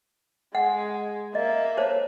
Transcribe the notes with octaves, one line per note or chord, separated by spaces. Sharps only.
G#3 F#5
A#3 D#5 E5
C5 C#5 A5